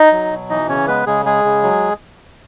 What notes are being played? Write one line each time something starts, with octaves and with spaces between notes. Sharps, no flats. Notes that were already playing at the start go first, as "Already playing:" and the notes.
Already playing: D#4 D#5
F#3
B2
E3 D#4 D#5
C#3 C#4 C#5
G#3 B3 B4
C#3 G#3 G#4
G#3 G#4
C#3
F#3